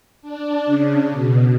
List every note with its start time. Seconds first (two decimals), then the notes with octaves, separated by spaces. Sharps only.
0.22 D4
0.66 C#3
1.10 B2